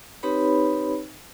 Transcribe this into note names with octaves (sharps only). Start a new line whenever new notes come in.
C4 D#4 G4 B4 C#5 B5